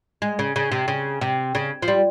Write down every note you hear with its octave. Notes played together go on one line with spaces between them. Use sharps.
G#3
C#3
C#3
C3
C#3
C3
C#3
F3
G3